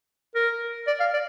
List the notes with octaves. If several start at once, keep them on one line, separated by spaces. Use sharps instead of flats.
A#4
D5
F5
D5